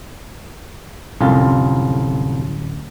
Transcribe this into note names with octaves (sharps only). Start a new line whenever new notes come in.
D1 C2 F2 C#4 F4